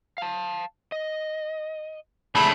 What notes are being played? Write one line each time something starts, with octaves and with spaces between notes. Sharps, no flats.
F5 A5
D#5
C#2 A3 D4 G#4 E5 B5